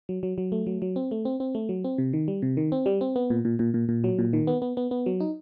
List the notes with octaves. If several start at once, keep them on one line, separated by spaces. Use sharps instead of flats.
F#3
F#3
F#3
A3
F#3
F#3
C4
A3
C4
C4
A3
F#3
C4
C3
D#3
G3
C3
D#3
C4
G3
C4
B3
A#2
A#2
A#2
A#2
A#2
F#3
A#2
D#3
B3
B3
B3
B3
F#3
D#4